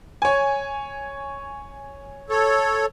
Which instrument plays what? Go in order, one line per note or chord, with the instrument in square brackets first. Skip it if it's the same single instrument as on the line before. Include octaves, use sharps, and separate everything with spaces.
[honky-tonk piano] C#5 G#5
[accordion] A4 C#5